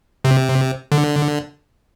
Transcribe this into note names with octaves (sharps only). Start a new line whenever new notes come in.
C3
D3